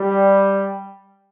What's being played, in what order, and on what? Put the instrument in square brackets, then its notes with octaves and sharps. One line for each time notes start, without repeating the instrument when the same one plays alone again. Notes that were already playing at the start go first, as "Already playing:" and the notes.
Already playing: [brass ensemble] G3